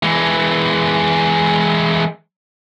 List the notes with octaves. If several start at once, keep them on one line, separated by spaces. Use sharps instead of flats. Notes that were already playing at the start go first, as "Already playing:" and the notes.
E3 G#3